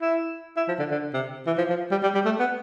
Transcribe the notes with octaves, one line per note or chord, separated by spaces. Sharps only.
E4
E4
F3
D3
D3
C3
E3
F3
F3
G3
G3
G3
A3
B3